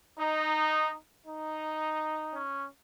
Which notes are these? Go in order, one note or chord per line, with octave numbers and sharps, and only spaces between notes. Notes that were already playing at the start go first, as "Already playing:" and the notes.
D#4
D#4
C#4